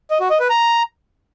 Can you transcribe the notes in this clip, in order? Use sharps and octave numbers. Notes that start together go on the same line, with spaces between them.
D#5
F#4
D#5
B4
A#5